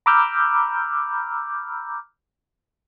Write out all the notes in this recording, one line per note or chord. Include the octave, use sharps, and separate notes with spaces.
A#5 B5 D6 E6 F6 G6